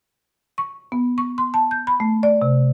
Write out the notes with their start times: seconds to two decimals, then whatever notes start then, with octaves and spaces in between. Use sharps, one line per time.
0.58 C#6
0.92 B3
1.18 C#6
1.38 C6
1.54 A5
1.71 G6
1.87 B5
2.00 A3
2.23 D5
2.42 C3